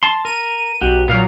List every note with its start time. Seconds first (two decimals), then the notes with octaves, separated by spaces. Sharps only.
0.03 A5 C6
0.25 A#4 D#7
0.81 B1 F#4 G4
1.08 A#2 F#3 B3 F5 F6